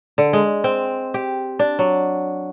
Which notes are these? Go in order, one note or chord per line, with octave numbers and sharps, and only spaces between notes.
D3
G#3
C4
G4
D4
F#3